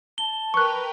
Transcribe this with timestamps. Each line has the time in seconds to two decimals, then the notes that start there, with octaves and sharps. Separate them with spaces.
0.18 A5 G7
0.54 A#4 B4 G5 C#6 F#6